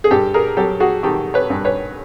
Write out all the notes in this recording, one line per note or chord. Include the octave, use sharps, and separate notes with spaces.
G#4
G2 G4 A4
G#4 A#4
F#3 G4 A4
F#4 G#4
D#3 G4 A4
B4 C#5
G2
B4 C#5